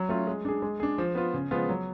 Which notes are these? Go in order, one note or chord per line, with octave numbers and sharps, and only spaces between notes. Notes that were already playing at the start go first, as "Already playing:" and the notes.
Already playing: F#3
A3 C#4 F4
G#3
D4 G#4
G#3
D4 G#4
F3
B3 F4
C#3
F3 G#3 B3 F4
F#3